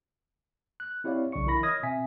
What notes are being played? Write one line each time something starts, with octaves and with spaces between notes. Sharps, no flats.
F#6
C4 E4 G4 C#5 D5 F5
B1 C#3 D4 D5 C#6 C#7
E3 E4 A#4 B5 A#6
C#5 D#5 D#6 F6 G#6 A#6
B2 C4 E5 G#5 B6